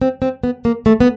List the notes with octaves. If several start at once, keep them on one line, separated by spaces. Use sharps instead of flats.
C4
C4
B3
A#3
A3
B3